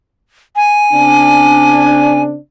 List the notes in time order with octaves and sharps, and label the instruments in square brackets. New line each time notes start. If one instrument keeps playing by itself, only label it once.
[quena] G#5
[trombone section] C#3 C4 D4